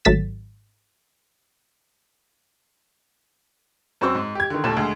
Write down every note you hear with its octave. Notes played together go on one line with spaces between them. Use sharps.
G#1 F#3 A3 A6 B6 E7
F#2 C4 F#4 C5 C#6 E6
G#2
G4 G#6
D3 D#3
D#2 A#2 A3 A5 E7
D2 G#3